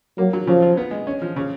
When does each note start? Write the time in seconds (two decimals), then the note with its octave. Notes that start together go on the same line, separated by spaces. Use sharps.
0.18 F#3 A#3
0.33 F#3
0.47 C#3 F3
0.62 F4
0.77 B3
0.91 G#3
1.07 C#4
1.22 F3
1.36 C#3